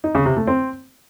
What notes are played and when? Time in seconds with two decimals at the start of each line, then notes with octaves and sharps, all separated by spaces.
0.04 D#4
0.15 C#3
0.26 C3
0.36 A3
0.47 C4